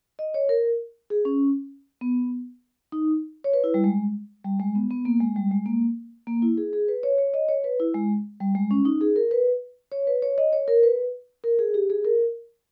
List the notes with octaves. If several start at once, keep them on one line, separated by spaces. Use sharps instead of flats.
D#5
C#5
A#4
G#4
C#4
B3
D#4
C#5
B4
E4
G3
G#3
G3
G#3
B3
B3
A#3
G#3
G3
G#3
A#3
A#3
E4
G#4
G#4
B4
C#5
C#5
D#5
C#5
B4
E4
G#3
G3
G#3
C#4
D#4
G#4
A#4
B4
C#5
B4
C#5
D#5
C#5
A#4
B4
A#4
G#4
G4
G#4
A#4